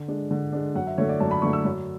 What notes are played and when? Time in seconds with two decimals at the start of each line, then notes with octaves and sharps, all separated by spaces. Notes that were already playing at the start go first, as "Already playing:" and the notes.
Already playing: D3
0.08 G#3 D4
0.31 D3
0.53 G#3 D4
0.75 F#2 F#5
0.87 E5
0.98 D3 A3 C#5
1.09 D5
1.20 F#2 A5
1.31 B5
1.42 D3 A3 C#6
1.53 E6
1.65 F#2